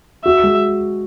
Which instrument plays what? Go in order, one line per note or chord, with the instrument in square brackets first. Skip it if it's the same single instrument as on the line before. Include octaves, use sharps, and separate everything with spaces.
[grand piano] F#4 [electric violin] E5
[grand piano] G#3